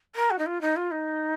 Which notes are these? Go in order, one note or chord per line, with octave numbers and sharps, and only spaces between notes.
A#4
F#4
D#4
F4
D#4
F4
D#4